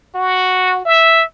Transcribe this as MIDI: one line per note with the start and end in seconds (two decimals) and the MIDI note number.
0.15 0.82 66
0.85 1.23 76